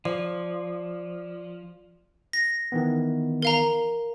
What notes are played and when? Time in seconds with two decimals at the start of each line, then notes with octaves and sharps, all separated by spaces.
0.05 F3 D5
2.33 A#6
2.72 D#3 E3 B3
3.42 A#4 F5 A#5